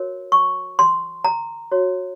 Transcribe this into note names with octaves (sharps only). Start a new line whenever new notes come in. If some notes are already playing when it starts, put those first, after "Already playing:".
Already playing: F#4 A#4 C#5
C#6
C6
A#5
F#4 C#5